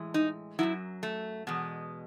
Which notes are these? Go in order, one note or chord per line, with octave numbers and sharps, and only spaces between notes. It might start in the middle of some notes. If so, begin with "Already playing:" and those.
Already playing: A2 E3 G#3
D#4
F#2 C#3 F#3 E4
A3
E2 B2 G#3